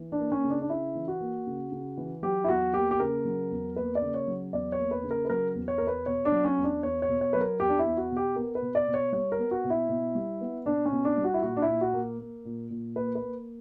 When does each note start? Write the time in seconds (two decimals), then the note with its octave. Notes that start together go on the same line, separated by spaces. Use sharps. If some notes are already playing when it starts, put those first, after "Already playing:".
Already playing: E3
0.12 D4
0.18 A#3
0.32 C#4
0.44 C#3
0.50 D4
0.62 D4
0.70 C#3 E4
0.95 E3
1.08 F#4
1.20 A#3
1.47 C#3
1.72 C#3
1.97 E3
2.23 F#3 G4
2.44 E4
2.48 E2 F#4
2.74 A#3 G4
2.91 G4
3.00 C#3 A#4
3.25 F#3
3.51 E2
3.76 A#3 B4
3.95 D5
4.02 C#3
4.14 C#5
4.27 F#3
4.53 E2 D5
4.72 C#5
4.78 A#3
4.91 B4
5.04 C#3
5.11 A#4
5.25 B4
5.30 F#3 A#4
5.55 E2
5.68 C#5
5.78 E2 A#4
5.87 B4
6.06 B2 C#5
6.25 D4
6.32 F#3
6.45 C#4
6.57 E2
6.64 D4
6.83 E2 C#5
7.02 C#5
7.09 B2
7.21 C#5
7.33 F#3 B4
7.41 A#4
7.60 E2 G4
7.69 D4
7.79 E4
7.85 E2
7.97 F#4
8.11 B2
8.16 G4
8.36 B3 A#4
8.55 B4
8.62 B2
8.75 D5
8.88 B2
8.94 C#5
9.12 G3 C#5
9.32 A#4
9.38 B3
9.51 F#4
9.64 B2
9.70 E4
9.89 B2
10.15 G3
10.41 B3
10.66 B2 D4
10.86 C#4
10.91 B2
11.05 D4
11.17 G3
11.24 F#4
11.34 E4
11.42 A#2 F#4
11.57 D4
11.62 E4
11.68 A#2
11.81 F#4
11.94 A#3
12.19 A#3
12.45 A#2
12.70 A#2
12.96 A#3 B4
13.15 B4
13.22 A#3